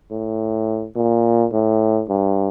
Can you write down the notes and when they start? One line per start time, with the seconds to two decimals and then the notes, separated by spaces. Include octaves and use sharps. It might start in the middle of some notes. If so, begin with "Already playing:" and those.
0.11 A2
0.96 A#2
1.53 A2
2.09 G2